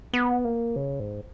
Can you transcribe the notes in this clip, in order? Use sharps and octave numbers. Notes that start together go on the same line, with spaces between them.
B3
A#3
C#3
G#2